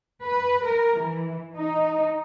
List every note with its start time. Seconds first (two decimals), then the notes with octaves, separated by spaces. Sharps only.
0.24 B4
0.64 A#4
0.99 E3
1.56 D#4